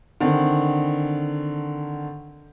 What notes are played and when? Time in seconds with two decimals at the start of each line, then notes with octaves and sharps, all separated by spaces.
0.21 D3 D#3 C4